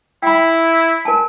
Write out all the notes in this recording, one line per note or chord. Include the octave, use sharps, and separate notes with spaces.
E4 G5 B5
A#4 G#5 A5